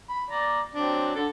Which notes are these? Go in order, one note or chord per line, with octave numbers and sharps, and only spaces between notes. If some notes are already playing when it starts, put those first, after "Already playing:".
B5
D5 A#5
F#3 C4 D4
D3 A4